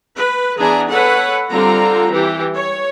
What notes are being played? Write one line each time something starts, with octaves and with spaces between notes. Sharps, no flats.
B4
E3 B3 D4 G#4 G#5 A#5
A4 B4 C#5 F#5
D3 G3 C4 F4 A#5
E3 G4
C#5